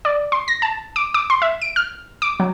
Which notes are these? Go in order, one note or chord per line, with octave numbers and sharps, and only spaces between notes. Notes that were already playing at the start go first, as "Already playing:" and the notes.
D5
C6
A#6
A5
D6
D6
C6
E5
D7
F6
D6
F#3